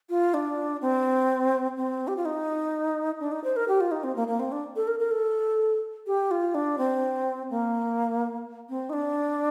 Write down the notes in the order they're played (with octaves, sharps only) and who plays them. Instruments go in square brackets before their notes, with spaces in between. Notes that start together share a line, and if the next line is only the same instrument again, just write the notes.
[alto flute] F4
D4
C4
C4
G4
F4
D#4
D4
D#4
C5
A#4
G4
F4
D#4
C4
A#3
A#3
C4
D4
A4
A#4
A#4
A4
G4
F4
D4
C4
A#3
C4
D#4
D4